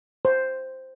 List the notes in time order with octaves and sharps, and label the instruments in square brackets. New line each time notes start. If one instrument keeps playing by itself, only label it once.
[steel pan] C5